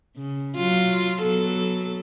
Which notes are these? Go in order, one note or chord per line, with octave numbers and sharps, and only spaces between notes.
C#3
F#3 F4
F#3 B3 A4